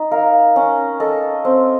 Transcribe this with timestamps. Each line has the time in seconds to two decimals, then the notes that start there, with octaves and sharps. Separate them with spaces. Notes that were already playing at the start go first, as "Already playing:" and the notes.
Already playing: D#4
0.11 A#4 F5
0.56 C#4
1.00 A4 D#5
1.45 C4